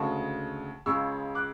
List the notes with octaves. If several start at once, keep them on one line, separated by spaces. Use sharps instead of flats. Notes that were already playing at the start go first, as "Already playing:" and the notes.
Already playing: D2 C#3 G#3 A5 C#6
C#2 C#3 G#3 C#6 E6
D6 F#6